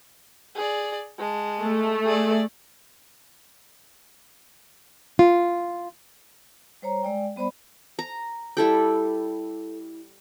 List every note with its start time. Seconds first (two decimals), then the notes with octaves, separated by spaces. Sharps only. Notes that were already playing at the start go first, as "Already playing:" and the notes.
0.55 G#4 D5
1.18 G#3 A5
1.62 A3
2.05 G#4 D5
5.19 F4
6.82 G3 C5 C#5 A#5
7.03 G#3 D5 G5
7.36 G3 B3 C5 D5 B5
7.99 A#5
8.57 G3 E4 A4 G5